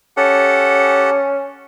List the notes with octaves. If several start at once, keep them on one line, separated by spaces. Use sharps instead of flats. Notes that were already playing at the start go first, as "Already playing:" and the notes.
C#4 G4 A4 F#5